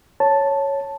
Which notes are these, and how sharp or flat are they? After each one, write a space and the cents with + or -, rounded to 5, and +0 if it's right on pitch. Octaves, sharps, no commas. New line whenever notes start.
C#5 +0 A5 +0